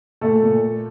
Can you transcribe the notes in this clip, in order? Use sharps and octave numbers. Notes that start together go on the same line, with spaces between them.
A#2 A3 A4
A#2
A3